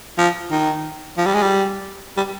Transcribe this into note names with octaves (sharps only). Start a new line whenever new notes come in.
F3
D#3
F3
G3
G#3
G3
G3